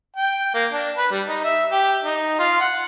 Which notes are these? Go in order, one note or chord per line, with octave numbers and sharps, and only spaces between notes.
G5
A#3
D4
B4
G3
D#4
E5
G4
D#4
F4
F#5